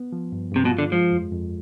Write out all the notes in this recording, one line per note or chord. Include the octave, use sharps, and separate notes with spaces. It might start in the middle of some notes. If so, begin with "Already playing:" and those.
Already playing: B3
F3
G2
G2 C3
B2
F4
D3
F3 G#3
F2
F2